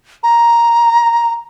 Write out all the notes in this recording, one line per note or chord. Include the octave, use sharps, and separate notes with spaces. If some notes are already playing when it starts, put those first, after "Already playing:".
A#5